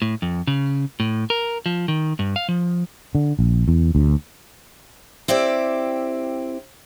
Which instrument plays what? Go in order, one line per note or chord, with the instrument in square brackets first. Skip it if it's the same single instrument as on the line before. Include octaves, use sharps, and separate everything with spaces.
[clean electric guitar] A2
F2
C#3
A2
A#4
F3
D#3
G2
F5
F3
[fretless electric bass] D3
A#1
E2
D2
[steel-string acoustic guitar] C4 E4 G4 D5